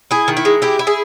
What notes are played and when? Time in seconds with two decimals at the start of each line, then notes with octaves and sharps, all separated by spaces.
0.11 E4 G#4
0.28 D#3
0.37 E4
0.45 G#3
0.62 E4 G4
0.79 E4
0.87 G#4